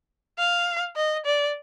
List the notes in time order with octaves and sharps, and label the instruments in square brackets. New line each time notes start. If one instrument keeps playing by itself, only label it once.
[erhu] F5
D#5
D5